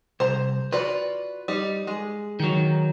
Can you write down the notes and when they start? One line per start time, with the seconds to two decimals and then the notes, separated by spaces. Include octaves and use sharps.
0.20 C2 C5 A#5
0.72 F4 F#4 B4 D5
1.48 G3 D#4
1.87 G#3
2.40 D#3 F#3